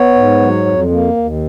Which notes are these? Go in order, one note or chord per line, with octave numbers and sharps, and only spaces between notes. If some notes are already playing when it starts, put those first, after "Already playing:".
Already playing: B3 C#5
G#2
F#3
F2
A#3
D#2